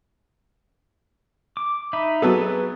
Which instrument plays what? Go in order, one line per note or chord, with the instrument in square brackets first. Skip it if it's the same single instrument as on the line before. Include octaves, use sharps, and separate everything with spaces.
[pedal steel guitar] D6
D#4 E5 B5
[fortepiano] F#3 B3 A4 [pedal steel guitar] G#4 B4